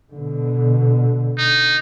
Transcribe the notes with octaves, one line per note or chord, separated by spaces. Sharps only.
B2 D3
D#4